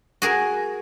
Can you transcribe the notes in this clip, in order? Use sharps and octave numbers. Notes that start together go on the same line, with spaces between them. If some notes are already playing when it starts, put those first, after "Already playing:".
F#4 G#4 A#4